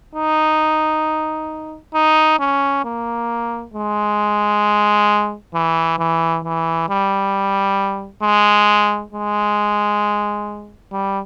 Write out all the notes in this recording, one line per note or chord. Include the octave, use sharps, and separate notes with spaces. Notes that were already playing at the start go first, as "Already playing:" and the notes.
D#4
D#4
C#4
A#3
G#3
E3
E3
E3
G3
G#3
G#3
G3